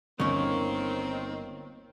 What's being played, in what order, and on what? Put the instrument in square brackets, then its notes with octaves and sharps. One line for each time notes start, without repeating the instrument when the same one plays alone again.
[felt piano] G1 D#2 [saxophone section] D#3 C4 [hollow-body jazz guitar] A#3 C#4 [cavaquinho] C#5